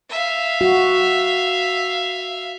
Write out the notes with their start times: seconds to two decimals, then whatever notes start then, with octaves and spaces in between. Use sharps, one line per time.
0.10 E5 F5
0.61 F#4